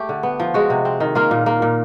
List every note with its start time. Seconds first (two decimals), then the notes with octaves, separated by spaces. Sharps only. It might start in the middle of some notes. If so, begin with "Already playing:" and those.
Already playing: A3 G4
0.09 D3
0.23 B3
0.40 F3
0.54 G#3 F#4
0.70 C3
0.85 C4
1.00 D#3
1.15 A#3 F4
1.31 A#2
1.46 A#3
1.62 A#2